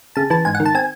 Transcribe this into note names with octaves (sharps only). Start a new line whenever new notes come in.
C#3 A5
E3 A5
G#2 G#5
F#5
D#3
A5
C4 G#5